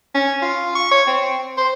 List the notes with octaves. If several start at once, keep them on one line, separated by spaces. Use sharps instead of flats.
C#4
F4
C#6
C#5
C4
C5